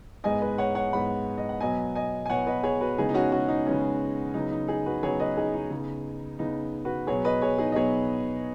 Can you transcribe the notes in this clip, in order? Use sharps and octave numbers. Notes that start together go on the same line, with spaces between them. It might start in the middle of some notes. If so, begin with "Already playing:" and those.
G#2 G#3 B3 D#5 G#5
B4 D#5
C#5 F#5
C#5 F#5
G#2 G#3 B3 F#5 B5
D#5
F#5
B2 F#3 B3 D#5 G#5
D#5 G#5
G#5
B2 F#3 B3 C#5 F#5
B4 D#5
G#4 C#5
F#4 B4
C#3 G#3 B3 D#4 G#4
D#4
C#4 F#4
C#4 F#4
D#4
C#3 G#3 B3 C#4
C#3 F#3 B3 D#4
D#4
D#4 G#4
F#4 B4
C#3 F#3 B3 G#4 C#5
B4 D#5
D#4 G#4
D#4
C#3 B3
C#3 B3 D#4
F#4 B4
B2 F#3 B3 G#4 C#5
B4 D#5
G#4 C#5
D#4 G#4
D#5
B2 F#3 B3 G#4 C#5